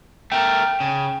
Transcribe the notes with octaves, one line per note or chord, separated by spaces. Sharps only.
A3 A#4 G5
C#3